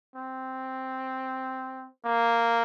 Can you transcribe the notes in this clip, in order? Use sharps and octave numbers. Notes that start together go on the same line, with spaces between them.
C4
A#3